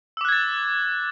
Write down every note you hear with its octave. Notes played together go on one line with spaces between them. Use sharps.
D6 E6 F#6 G#6 A6